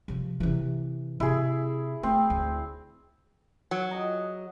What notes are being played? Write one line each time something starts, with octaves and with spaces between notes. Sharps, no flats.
C3 F3
C3 E3
C3 E4 G#4
A3 C4
D2
F#3
G#4 D#5 A#5